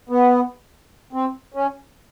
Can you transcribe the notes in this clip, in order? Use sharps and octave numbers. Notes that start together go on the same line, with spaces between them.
B3
C4
C#4